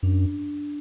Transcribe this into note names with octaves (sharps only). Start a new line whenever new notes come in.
F#2 D4